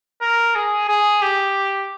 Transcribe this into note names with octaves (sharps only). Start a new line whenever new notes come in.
A#4
G#4
G#4
G4